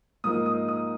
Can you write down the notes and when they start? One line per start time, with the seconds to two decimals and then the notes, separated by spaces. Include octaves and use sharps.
0.24 G#2 F3 A#3 D#4 D#6
0.46 D#6
0.68 D#6